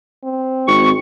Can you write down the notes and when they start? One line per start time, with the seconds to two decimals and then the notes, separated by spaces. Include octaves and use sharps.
0.24 C4
0.68 G#1 C#6